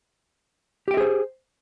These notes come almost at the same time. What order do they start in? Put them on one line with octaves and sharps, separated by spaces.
G4 G5 E5 G#4 C5